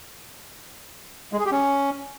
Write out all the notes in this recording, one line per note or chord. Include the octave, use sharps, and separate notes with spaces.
G#3
G#4
G4
C#4